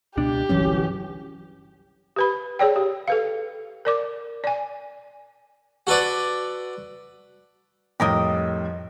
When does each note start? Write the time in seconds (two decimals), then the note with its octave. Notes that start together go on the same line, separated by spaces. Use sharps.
0.17 C#2 B2 D4 G4
0.49 G1 C2 E3 F#3 C#4
2.16 G4 B4 B5
2.59 G#4 C#5 D5 G5
2.76 G4
3.08 A4 B4 F5
3.85 A#4 D5 D6
4.44 D5 G#5
5.87 F#4 A4 B4 D5
8.00 F2 A2 G3 G4 A#4 D#5